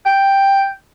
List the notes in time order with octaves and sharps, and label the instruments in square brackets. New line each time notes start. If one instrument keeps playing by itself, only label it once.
[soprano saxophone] G5